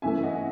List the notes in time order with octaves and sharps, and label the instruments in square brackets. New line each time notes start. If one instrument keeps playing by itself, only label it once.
[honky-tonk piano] C#3 E3 A3 E5 G#5
D#5 F#5